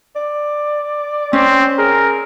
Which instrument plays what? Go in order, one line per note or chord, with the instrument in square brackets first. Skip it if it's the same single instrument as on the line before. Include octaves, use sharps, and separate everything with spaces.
[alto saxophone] D5
[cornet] C4 [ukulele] C#4
[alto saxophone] G#4 [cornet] A#4